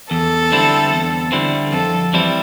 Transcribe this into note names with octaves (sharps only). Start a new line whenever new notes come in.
E2 A4
D3 G3 C4 E4
E2
D3 G3 C4 E4
F2 A4
E3 G3 C4 E4